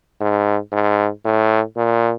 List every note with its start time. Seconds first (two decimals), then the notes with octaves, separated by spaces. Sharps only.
0.21 G#2
0.72 G#2
1.25 A2
1.77 A#2